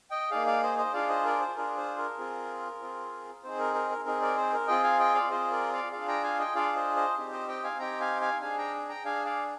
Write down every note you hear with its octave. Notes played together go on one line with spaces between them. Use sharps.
D#5 G5
A#3 D#4 G#4 D5 F5
D5 F5
C5 D#5
C5 D#5
D4 F4 G#4 D5 F5
C5 D#5
A#4 D5
C5
D4 F4 G#4 A#4
C5
A#4
C4 F4 G#4
C4 F4 G#4
C4 D#4 G#4 C5
A#4
A#4
A#4
C4 D#4 G#4 A#4
A#4 D5
C5
A#4
C4 F4 G#4 D#5 G5
F5 G#5
D#5 G5
D5 F5
C4 F4 G#4 C5 D#5
A#4 D5
D5 F5
D4 F4 G#4 D5 F5
G5 A#5
F5 G#5
D#5 G5
D4 F4 G#4 D5 F5
C5 D#5
C5 D#5
C4 D#4 G4
C5 D#5
D#5 G5
F5 G#5
C4 D#4 G4 G5 A#5
F5 G#5
F5 G#5
D4 G#4 F5 G#5
G5 A#5
G5 A#5
D4 G#4 F5 G#5
D5 F5